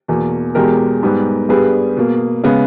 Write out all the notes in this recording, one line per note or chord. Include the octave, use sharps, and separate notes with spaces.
E2 B2 A#3
E2 B2 G#3 G4 A#4
G#2 G3 B3
G2 G3 B3 G#4 B4
B2 A#3
C#3 G#3 B3